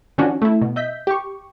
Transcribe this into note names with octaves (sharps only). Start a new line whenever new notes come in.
D#3 F3 C#4 D4 F#4
A3 E4
B2
D#5 E5 G6 B6
G4 C#6